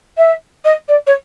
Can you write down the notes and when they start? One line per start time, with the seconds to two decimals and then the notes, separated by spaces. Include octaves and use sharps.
0.17 E5
0.64 D#5
0.88 D5
1.06 C#5